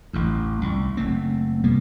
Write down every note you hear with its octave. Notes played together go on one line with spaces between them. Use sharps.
A1 E2
C2
F#1 A3 C4
C3 G3 A#3 B3